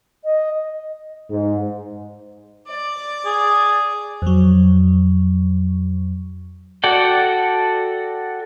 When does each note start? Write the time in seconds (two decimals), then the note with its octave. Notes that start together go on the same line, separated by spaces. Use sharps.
0.24 D#5
1.30 G#2
2.69 D5
3.26 G#4
4.22 F2 F#3
6.84 F#4 A4 D5 F#5 G5